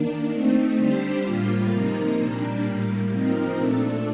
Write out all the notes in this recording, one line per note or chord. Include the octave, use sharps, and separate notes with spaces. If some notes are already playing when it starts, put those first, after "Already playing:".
Already playing: D#3 A#3 D4
A3 C4 D#4
D3 G3 D4 G4 C5
A2 G3 A#3 F4
C3 F3 A#3 D#4 A#4
A#2 G3 A#3 D4
A2 G3 A#3
C3 F3 C4 D#4 A#4
A#2 A3 D4 A4